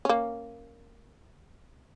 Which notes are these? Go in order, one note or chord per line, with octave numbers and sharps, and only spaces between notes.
A#3 C#4